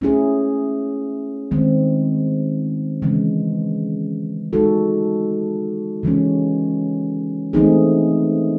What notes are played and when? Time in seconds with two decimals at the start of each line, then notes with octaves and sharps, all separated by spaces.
0.01 A3 C#4 E4 G#4
1.51 D#3 G#3 C4
3.02 C#3 E3 G#3
4.53 G#3 D#4 F#4 A4
6.03 C#3 E3 G#3 C#4
7.53 E3 A3 C4 D#4 G#4